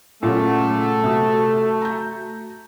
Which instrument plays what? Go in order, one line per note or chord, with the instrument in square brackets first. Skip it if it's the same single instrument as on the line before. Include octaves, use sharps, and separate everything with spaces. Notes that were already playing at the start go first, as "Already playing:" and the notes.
[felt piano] A#2 C#3 [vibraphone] F#3 F#5 [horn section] A3
[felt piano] C3 D#6 [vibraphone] F#4
[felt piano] A#5 G6